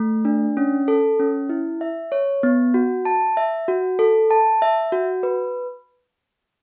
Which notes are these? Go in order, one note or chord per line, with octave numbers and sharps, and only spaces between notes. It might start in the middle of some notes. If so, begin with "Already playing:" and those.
Already playing: A3
D4
C#4
A4
C#4
E4
E5
C#5
B3
F#4
A5
E5
F#4
A4
A5
E5
F#4
B4